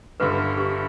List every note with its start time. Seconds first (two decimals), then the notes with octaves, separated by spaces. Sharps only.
0.20 G1 G2 D3 B4
0.58 G4